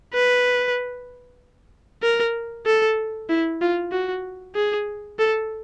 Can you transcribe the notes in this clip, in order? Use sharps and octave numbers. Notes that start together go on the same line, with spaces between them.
B4
A#4
A4
E4
F4
F#4
G#4
A4